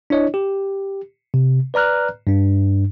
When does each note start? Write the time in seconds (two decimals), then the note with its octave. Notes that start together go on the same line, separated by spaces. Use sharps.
0.10 D4 E4 C#5 D#5
0.34 G4
1.34 C3
1.74 B4 D5 A#5 F6 F#6
2.27 G2 D4